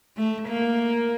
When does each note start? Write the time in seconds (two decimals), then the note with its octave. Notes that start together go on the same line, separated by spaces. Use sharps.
0.17 A3
0.48 A#3